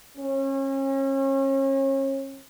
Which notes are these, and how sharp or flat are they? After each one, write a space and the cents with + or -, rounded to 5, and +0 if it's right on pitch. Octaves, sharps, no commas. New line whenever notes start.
C#4 -35